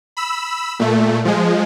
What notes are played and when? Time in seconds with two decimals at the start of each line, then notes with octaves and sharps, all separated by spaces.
0.17 B5 E6
0.79 A#2 A3
1.25 F3 G#3